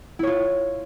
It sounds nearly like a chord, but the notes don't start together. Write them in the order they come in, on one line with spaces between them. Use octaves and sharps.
E4 C#5 F4